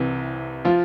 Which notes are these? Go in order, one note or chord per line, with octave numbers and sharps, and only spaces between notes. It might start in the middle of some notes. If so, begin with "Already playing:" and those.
Already playing: C2 C3 E3
F3 F4